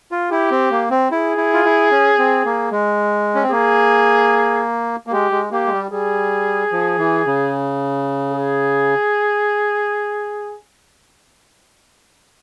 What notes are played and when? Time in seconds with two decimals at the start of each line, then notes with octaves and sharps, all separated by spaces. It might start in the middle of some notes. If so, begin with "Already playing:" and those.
0.12 F4
0.31 E4 G4
0.51 C4
0.71 A#3
0.91 C4
1.12 E4 G#4
1.37 E4
1.53 F4
1.65 E4
1.91 C#4
2.19 C4
2.45 A#3
2.71 G#3
3.35 C#4
3.43 C4
3.52 A#3 G#4
5.07 A#3
5.12 G#3 G4
5.31 G#3
5.52 A#3 G4
5.66 G#3
5.72 G3
5.91 G3 G#4
6.72 F3
6.98 E3
7.26 C#3
8.32 G#4